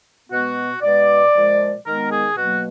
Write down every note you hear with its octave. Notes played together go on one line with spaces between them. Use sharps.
B2 G#3 B3 F#4
B2 G#3 B3 D5
A#2 F3 G#3
D#3 G#3 B3 A#4
G#4
B2 F#3 A#3 F#4